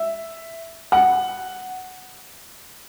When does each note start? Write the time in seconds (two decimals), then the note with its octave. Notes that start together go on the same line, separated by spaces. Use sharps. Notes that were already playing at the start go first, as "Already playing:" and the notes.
Already playing: E5
0.92 F#5